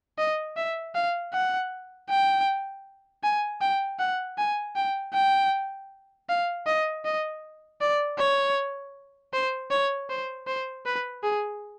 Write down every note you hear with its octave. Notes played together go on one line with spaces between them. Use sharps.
D#5
E5
F5
F#5
G5
G#5
G5
F#5
G#5
G5
G5
F5
D#5
D#5
D5
C#5
C5
C#5
C5
C5
B4
G#4